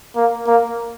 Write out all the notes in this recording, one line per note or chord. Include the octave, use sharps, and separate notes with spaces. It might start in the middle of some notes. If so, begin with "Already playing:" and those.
A#3
A#3